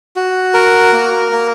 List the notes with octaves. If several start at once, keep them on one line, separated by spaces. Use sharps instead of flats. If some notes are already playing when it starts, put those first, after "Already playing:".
F#4
A#4
A#3
A#3